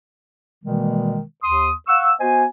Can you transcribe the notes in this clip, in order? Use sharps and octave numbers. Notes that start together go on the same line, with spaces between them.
B2 D#3 E3 G3 G#3 A#3
D#2 C6 D#6
F5 F#5 C#6 E6
B3 F#4 C5 D#5 G#5